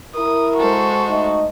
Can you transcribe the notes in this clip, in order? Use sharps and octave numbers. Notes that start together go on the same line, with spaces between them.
E4 A#4 D#6
G#3 F#4 A4 C5
A3 D#4 D#5